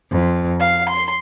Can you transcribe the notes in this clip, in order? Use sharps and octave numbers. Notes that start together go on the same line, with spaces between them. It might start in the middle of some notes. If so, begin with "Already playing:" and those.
F2
F5
C6